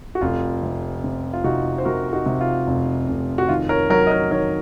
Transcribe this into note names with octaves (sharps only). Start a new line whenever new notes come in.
F#4
F1 F4
C3
C3
F4
C3 D#4 F#4
C5
C3 F#4 A#4
D#4 F#4
C3
F4
F1
F1
F#4
D#3 F4
A#4 C#5
F#3 A#4 C#5
D#5
A#4 C#5
D#3 A#4 C#5